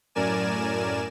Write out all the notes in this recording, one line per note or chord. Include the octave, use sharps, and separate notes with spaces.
F#2 A2 A#4 D5 G#5 E7